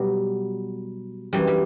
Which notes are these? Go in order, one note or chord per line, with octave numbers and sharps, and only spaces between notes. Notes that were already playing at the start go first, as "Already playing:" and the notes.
Already playing: B2 F#3 G3
F#2 E3 G3
G3